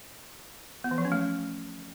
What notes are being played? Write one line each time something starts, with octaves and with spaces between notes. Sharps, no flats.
B3
E3
F3
C#4
A3